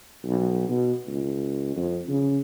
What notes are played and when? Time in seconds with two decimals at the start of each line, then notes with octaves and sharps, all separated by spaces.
0.25 B1
0.70 B2
1.07 C#2
1.76 F2
2.09 C#3